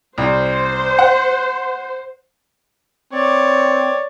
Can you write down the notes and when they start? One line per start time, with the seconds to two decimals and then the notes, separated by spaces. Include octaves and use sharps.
0.18 C2 C5
0.99 F#5
3.13 C4 C#5 D5